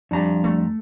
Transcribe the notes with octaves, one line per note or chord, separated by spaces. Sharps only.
F2 G3 D4 A#5
A3